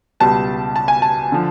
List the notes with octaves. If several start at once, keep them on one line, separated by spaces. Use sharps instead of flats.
C#2 B2 G3 A5
A5
G#5
A5
D3 F3